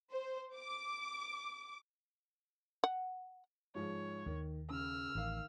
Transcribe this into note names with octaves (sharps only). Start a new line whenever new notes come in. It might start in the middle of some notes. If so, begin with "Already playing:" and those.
C5
D6
F#5
G#2 F3 G#3 C#5
D#2 D#3
C#3 E6 F6
A1 D#3 F5